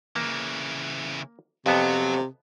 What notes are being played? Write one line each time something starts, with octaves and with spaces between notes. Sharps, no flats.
C#3 E3 A#3
F2 C3 F#3 B3 A5